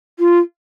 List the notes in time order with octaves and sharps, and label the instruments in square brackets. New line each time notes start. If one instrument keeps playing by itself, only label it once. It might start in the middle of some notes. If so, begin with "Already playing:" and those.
[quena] F4